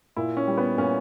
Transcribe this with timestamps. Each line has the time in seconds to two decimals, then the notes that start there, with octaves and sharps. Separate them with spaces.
0.16 A#2 E4
0.37 C#4
0.47 G3
0.58 B3
0.78 A#2 C#4